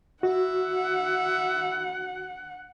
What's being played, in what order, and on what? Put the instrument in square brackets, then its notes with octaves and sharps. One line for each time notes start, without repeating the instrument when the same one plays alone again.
[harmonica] E4 [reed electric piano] F#4 [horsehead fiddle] F#5